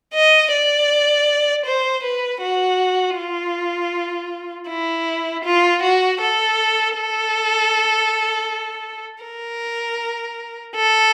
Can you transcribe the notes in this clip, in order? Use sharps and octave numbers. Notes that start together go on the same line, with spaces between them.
D#5
D5
C5
B4
F#4
F4
E4
F4
F#4
A4
A4
A#4
A4